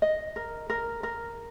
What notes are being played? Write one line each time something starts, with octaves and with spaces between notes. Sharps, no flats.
D#5
A#4
A#4
A#4